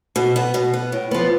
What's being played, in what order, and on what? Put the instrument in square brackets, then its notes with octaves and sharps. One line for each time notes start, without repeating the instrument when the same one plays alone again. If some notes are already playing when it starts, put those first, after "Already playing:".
[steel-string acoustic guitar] B2
B3
B2
B3
A2
F3 B3